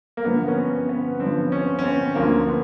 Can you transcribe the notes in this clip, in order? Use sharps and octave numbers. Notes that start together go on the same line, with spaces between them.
A#3
G2 D3 F3 B3
C#4
C4
B3
G2 D3 F3 C4
C#4
C#4
C4
D2 D3 F3 A#3
B3